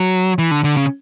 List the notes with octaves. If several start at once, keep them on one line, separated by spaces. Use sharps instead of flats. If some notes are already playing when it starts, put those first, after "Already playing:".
Already playing: F#3
E3
D3
D3
C#3